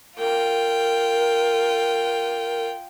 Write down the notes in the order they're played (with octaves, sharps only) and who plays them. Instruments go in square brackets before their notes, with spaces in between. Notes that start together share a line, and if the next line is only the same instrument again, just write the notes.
[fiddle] F4 G5 [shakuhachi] A#4